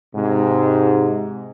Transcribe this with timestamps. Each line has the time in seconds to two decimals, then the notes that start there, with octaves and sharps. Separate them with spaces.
0.16 G#2 C3